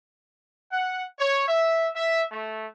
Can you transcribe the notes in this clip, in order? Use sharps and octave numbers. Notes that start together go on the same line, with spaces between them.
F#5
C#5
E5
E5
A3